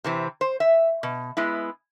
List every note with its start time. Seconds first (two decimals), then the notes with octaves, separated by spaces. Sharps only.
0.04 C3 E3 C4
0.41 C5
0.60 E5
1.03 B2
1.37 G#3 B3 E4